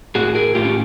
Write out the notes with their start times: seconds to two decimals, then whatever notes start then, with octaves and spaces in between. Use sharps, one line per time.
0.15 A2 F#4 G#4
0.35 G#4 A#4
0.55 A2 F4 G4
0.65 C#4